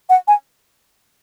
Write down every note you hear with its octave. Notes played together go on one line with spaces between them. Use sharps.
F#5
G#5